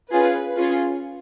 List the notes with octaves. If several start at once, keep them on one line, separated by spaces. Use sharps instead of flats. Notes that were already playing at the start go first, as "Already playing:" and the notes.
C#4 F4 G#4 B4
C#4 F4 G#4